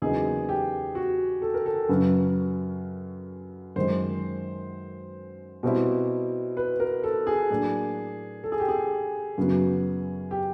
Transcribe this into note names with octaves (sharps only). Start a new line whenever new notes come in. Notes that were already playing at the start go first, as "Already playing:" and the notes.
E2 C#3 F#3 A#3 D#4 G#4
G4
F#4
A4
A#4
A4
F#2 C#3 F#3 B4
F#2 D#3 G#3 C5
B2 G3 C4 E4
B4
A#4
A4
G#4
A2 F#3 A#3 D4
A4
G#4
G4
G#4
F#2 C#3 F#3 B3
G4